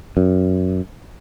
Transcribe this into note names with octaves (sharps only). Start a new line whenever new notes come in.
F#2